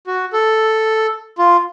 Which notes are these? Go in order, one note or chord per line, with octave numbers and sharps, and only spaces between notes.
F#4
A4
F4